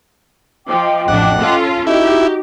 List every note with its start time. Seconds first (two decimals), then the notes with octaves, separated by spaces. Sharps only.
0.67 F3 D#5 G5 D6
1.08 A1 F2 D4 F#5
1.40 C#4 F4 A4
1.87 D#4 E4 F#4 G4 D#5